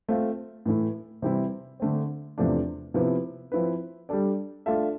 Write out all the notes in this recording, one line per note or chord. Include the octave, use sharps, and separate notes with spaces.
A3 C4 F4
A2 E3 A3 E4
C3 E3 G3 C4 E4
D3 A3 C4
E2 C3 F3 A3 D4
C3 F3 B3 E4
F3 C4 E4 B4
G3 D4 A4 D5
A3 D4 F4 A4 E5